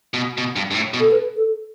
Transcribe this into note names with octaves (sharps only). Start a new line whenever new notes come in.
B2
B2
G2
G2
A2
B2
A4
B4
A4